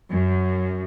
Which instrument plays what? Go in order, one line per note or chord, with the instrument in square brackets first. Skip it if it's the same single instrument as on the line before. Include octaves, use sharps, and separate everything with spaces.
[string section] F#2